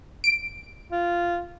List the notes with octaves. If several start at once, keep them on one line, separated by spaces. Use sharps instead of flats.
D7
F4